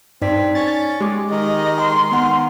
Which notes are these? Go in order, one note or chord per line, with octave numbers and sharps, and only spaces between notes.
G2 C4 D#4 D5 B6
C#4 A6
G#3 G4 D6
D#3 D#5
C6
D#3 B3 F#5